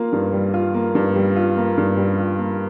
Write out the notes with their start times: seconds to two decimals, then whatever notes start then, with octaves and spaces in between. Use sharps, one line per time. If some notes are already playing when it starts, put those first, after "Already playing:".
Already playing: A#3 F4
0.12 G2
0.33 G3
0.54 F4
0.74 A#3
0.95 G2
1.16 G3
1.36 F4
1.57 A#3
1.78 G2
1.97 G3
2.18 F4
2.39 A#3